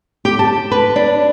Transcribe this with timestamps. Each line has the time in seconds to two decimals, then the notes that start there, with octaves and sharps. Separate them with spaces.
0.25 G4
0.39 A5
0.72 B4
0.96 D4